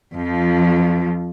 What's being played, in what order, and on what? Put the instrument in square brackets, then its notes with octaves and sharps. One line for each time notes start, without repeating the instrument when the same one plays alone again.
[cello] F2 F3